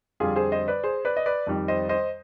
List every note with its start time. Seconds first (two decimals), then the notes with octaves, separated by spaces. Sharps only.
0.20 F2 D3 G3 F4 G#4
0.36 G#4 C5
0.52 C5 D#5
0.68 B4 D5
0.84 G#4 C5
1.05 B4 D5
1.17 D#5
1.26 B4 D5
1.47 F2 D#3 G3
1.68 C5 D#5
1.89 C5 D#5